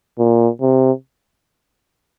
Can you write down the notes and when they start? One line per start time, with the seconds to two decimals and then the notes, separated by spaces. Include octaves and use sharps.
0.19 A#2
0.61 C3